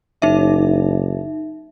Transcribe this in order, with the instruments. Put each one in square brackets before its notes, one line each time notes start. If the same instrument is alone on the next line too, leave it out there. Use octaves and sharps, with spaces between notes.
[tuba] F#1 [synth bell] D#4 E5